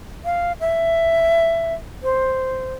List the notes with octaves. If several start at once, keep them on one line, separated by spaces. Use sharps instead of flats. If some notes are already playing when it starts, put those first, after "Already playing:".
F5
E5
C5